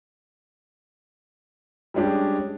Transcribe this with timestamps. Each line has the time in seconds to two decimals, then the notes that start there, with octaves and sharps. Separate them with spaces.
1.94 G3 G#3 C#4 D4 G4